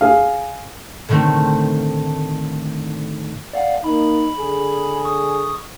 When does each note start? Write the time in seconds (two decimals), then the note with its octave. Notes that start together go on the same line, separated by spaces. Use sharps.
0.01 G#4 F5
1.09 A2 D3 D#3 A3 C4
3.53 D5 F5 F#5
3.84 A#3 D#4 B5
4.38 D3 G#4
5.05 C#6 D#6